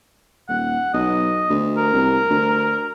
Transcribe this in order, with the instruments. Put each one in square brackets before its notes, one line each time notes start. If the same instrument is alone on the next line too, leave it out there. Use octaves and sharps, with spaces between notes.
[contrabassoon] D#1 [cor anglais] F#5
[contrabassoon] B1 [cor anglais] D#5
[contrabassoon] D2
[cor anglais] A#4
[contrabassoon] C2
D2